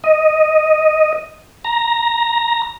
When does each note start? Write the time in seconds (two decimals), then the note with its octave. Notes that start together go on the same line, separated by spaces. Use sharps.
0.04 D#5
1.65 A#5